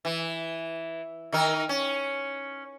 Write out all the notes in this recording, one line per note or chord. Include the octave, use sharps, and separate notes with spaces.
E3
D#3 D#4 A#4
C#4